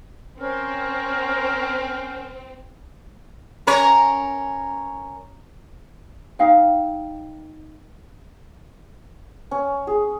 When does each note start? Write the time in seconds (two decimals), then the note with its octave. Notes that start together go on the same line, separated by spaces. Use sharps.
0.38 C4 C#4 A#4 C5
3.67 C#4 A#4 C#5
6.39 D#4 F5 G5
9.51 C#4
9.87 G#4